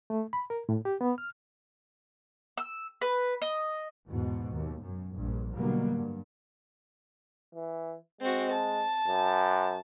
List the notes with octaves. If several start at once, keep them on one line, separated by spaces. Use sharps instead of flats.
A3
B5
A#4
A2
G4
B3
F6
E6
B4
D#5
E2 G#2 B2
D#2
F#2
A#1 G2
B2 D3 F#3 G3 A#3 B3
G2
E3
G#3 C4 F#4
A5
F#2